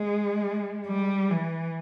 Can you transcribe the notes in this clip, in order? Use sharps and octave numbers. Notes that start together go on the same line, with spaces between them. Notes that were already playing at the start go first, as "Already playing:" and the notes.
Already playing: G#3
G3
E3